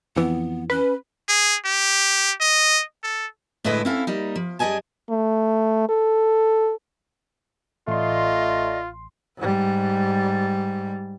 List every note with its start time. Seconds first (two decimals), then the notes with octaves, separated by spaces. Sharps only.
0.16 F2 E3 B3
0.70 C#4 B4
1.29 G#4
1.65 G4
2.41 D#5
3.03 A4
3.64 A2 D3 G#3 E4 B4 D#5
3.85 C4 C#4 E4 A4 F5
4.07 G3 A#3 D#4
4.36 F3
4.59 F#2 G3 G#4 D#5 G#5 A5
5.10 A3
5.89 A4
7.88 A1 A3 F4 D5 D#5 C6
9.38 G#2 G3